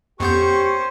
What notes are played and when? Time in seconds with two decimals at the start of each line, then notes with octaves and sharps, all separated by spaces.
0.20 F2 B3 C#4 G4 C5 C#6 G6